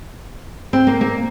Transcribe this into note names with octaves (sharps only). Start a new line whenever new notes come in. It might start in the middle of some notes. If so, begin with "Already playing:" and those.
C4
A#3
A#3